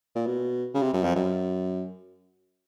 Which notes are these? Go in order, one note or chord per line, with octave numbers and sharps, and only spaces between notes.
A#2
B2
C#3
C3
F#2
F2
F#2